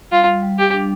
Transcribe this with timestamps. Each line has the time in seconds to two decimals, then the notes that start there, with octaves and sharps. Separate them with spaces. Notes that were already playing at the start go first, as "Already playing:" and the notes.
0.12 G3 F4
0.42 G3
0.58 G4
0.74 D4